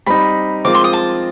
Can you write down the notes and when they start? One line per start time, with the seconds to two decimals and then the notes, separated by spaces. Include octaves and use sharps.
0.06 G3 C4 D#4 B5
0.65 F3 G#3 C4 F4 A#4 D6
0.75 C6
0.84 D#6
0.93 A5